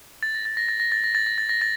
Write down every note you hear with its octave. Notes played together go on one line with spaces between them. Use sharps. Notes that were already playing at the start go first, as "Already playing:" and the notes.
A6
A#6
A6
A#6
A6
A#6
A6
A#6
A6
A#6
A6
A#6
A6